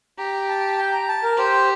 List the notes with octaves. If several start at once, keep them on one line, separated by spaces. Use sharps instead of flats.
G4 A#5
A5
G5
A#5
A5
A#4
G4 C5